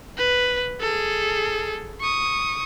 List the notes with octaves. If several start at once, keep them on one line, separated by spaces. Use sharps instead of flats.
B4
G#4 A4
C#6 D#6